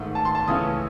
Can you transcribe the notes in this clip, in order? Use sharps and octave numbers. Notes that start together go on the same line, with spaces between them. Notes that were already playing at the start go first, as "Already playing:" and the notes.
Already playing: G#2 D#3 A3
A5
C6
A5
C#2 C#3 E3 A3 C#4 D#6